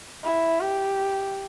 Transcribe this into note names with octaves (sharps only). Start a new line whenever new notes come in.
E4
G4